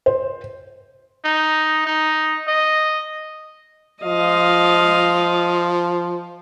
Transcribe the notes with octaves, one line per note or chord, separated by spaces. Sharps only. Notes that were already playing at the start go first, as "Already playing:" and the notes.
C5
D#4
D#4
D#5
F3 D#5 F5